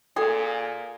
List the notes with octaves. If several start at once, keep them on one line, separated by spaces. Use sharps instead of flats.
A#2 G#4 A4 G5